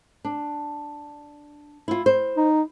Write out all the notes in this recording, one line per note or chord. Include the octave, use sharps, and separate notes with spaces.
D4
E4 F4
C5
D#4